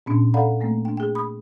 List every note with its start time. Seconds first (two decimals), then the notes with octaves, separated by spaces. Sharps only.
0.06 A#2 B3 C#4 D4
0.34 A4 D5 F5 F#5 A#5 B5
0.60 A3 A#3 C4
0.85 D4 G5
0.97 G#4 G5
1.15 B5 D#6